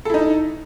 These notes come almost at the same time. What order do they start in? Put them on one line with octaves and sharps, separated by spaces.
A4 E4 D#4